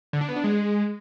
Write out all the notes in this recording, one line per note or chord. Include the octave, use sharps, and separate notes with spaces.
D3
D4
B3
D4
G#3